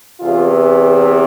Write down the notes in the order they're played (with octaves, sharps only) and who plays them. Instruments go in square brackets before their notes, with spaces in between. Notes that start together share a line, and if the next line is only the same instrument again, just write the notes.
[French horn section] E2 C3 E3 F4